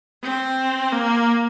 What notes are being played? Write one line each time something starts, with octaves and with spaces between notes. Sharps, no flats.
C4
A#3